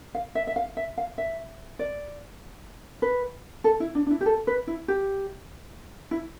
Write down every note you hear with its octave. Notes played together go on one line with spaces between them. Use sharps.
F5
E5
E5
F5
E5
F5
E5
D5
B4
A4
E4
D4
D4
E4
G4
A4
B4
E4
G4
E4